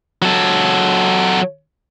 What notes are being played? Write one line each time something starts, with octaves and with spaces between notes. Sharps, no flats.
F#3 A4